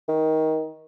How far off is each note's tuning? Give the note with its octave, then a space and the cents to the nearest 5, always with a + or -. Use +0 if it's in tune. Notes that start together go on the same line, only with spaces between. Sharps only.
D#3 +20